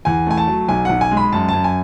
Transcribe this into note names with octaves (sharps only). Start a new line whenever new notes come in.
E2 G#5
A3 G#5
A5
F#3
B1 G#5
B1 F#5
G#5
G#3
B5
F#2 A5
F#2 A5
G#5